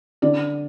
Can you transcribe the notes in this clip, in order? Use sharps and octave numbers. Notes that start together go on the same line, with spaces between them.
D3 D5